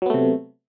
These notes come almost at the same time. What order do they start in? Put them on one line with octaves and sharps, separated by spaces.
F#3 B3 A3 C3